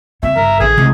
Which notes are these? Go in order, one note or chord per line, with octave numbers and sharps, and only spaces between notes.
C#2 C4 E5
G1 A#4
A1 D3 G#4
C2 C3 G#3